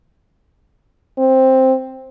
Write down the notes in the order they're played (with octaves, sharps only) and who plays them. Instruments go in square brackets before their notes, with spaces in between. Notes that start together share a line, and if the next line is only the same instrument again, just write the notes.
[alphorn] C4